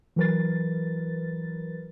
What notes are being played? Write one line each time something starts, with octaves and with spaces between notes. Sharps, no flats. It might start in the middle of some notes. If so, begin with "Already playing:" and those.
E3 F#3 A#4 B4 A6